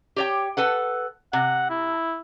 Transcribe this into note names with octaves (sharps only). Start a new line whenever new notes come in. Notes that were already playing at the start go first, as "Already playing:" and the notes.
G4 C#5 G5
A4 B4 F#5
C3 F#5
E4